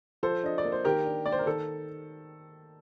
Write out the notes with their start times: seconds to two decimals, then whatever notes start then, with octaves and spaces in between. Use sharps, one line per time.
0.23 F3 A4 C5
0.44 D4 D#5
0.58 D5
0.65 A#3
0.72 C5
0.85 D#3 G4 A#4
1.05 D4
1.25 A#3 D5
1.32 C5
1.39 A#4
1.46 D#3 A4